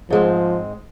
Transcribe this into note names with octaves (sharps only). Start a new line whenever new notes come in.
G#2 F3 G#3 C4